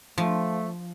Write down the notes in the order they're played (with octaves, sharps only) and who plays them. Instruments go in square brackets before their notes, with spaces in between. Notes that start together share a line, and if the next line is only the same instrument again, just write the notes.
[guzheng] F3 [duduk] A3